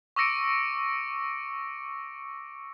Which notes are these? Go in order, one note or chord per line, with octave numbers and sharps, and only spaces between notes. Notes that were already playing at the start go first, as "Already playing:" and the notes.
C#6 D6 E6 A#6 C#7 D7